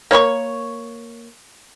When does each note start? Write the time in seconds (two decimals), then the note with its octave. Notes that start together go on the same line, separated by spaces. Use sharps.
0.11 A#3 C#5 B5 C#6